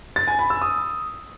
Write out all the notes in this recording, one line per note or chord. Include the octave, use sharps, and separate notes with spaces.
A6
G#5
B5
E6
D#6